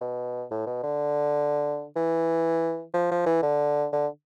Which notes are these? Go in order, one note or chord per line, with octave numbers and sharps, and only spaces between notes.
B2
A2
B2
D3
E3
F3
F3
E3
D3
D3